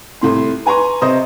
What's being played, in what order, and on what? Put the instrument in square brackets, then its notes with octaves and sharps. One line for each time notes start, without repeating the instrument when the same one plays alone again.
[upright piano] C2 A2 C6
B4 G#5 A#5 C6 C#6
C3 C5 D#5 D#6